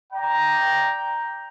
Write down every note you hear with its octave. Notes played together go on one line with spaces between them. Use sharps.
D5 G5 A#5